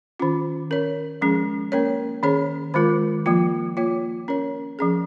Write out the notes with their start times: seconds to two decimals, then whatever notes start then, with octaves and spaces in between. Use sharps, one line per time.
0.20 D#3 C#4 F4
0.71 C#4 A#4 C#5
1.21 F3 G#3 C#4 G#4
1.72 A#3 C#4 A#4 C#5
2.23 D#3 C#4 G#4 C#5
2.74 D#3 G#3 F4 A#4
3.26 F3 A#3 F4
3.77 A#3 F4 C#5
4.28 C#4 A#4 C#5
4.79 F3 C#4 G#4